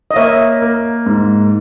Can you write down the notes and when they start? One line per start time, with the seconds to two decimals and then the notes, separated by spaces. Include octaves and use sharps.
0.11 D#5
0.16 A#3 C#5 E5
0.62 A#3
1.06 G#2